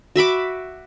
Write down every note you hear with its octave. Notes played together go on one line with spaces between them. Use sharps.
F#4 E5 B5 D6